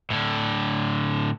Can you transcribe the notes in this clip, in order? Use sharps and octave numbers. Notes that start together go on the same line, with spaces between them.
A2 D3